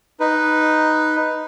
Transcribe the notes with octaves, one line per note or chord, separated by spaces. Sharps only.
D#4 B4